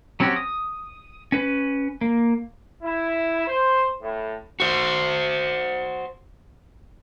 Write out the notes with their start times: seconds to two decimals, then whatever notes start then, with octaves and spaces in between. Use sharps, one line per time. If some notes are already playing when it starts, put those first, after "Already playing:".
0.20 F#3 C4 C#4 F#4 G4
0.36 D#6
1.32 C#4 B4
2.01 A#3
2.83 E4
3.48 C5
4.02 A2
4.60 F#4 C5